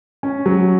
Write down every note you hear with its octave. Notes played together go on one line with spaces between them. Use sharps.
C#4
F#3